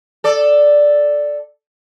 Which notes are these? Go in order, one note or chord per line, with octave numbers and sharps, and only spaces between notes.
A4 D5